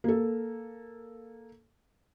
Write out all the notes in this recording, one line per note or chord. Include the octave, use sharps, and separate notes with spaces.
A#3 A4